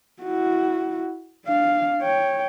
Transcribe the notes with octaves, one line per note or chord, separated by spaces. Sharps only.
E4 F#4
D4 F5
C#5 G5